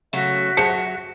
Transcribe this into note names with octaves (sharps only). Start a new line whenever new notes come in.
C#3 F#3 A3 F#4 E5
F#3 G#4 C5 A5 C#7